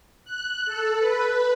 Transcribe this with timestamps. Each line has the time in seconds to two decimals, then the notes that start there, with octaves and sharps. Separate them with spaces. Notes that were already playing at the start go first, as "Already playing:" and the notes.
0.24 F#6
0.66 A4
0.99 B4